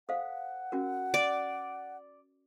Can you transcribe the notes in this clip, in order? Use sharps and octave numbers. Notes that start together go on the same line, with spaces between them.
A4 C5 F5 F#5
C#4 F#4 A#4
D5